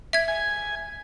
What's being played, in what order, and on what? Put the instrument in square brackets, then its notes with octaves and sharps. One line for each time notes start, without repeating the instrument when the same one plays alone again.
[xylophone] E5 G#6
[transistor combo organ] G#5